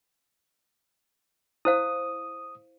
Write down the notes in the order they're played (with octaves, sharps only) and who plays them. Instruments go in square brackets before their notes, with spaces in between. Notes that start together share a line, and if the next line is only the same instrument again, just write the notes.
[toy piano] E4 C5 F5 [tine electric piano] D#6